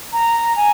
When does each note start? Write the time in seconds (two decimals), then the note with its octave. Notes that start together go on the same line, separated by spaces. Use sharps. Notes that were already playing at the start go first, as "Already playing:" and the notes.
0.13 A#5
0.56 G#5